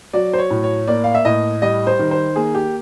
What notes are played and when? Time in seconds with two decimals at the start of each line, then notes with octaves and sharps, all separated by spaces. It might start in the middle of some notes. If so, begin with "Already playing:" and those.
0.13 F#3 D5
0.33 C5
0.38 C#5
0.50 A2
0.63 C#5
0.88 A#3 D5
1.04 F5
1.15 E5
1.25 A2 D#5
1.62 G3 D#5
1.87 C5
1.99 D#3
2.11 C5
2.36 A#3 G#4
2.55 G4